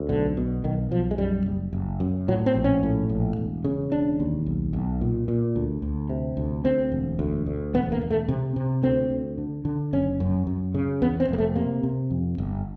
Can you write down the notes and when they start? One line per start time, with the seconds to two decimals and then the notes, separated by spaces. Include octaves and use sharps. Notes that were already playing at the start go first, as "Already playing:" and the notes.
Already playing: D2
0.09 B1 D3
0.37 B2
0.64 B1 D#3
0.91 B1 F3
1.11 G#3
1.18 F#2 G3
1.46 F#1
1.73 F#1
2.00 F#2
2.28 A2 F#3
2.46 C4
2.55 A#1
2.64 C#4
2.83 A2
3.09 A#1
3.37 E1
3.64 C#3
3.92 E1 D4
4.20 D#2
4.46 B1
4.73 B1
5.01 A#2
5.28 A#2
5.56 D2
5.82 D2
6.09 C3
6.37 D2
6.64 D2 C4
6.92 E1
7.19 D2
7.46 D2
7.74 E1 B3
7.92 A#3
8.01 E1
8.10 A3
8.28 C3
8.56 C3
8.82 D2 C4
9.10 D2
9.38 D3
9.65 D3
9.93 F#1 C#4
10.20 F#2
10.47 F#2
10.74 C#3
11.02 E2 B3
11.20 C4
11.29 F1 A#3
11.38 A3
11.56 C3 A#3
11.83 C3
12.11 F2
12.38 G1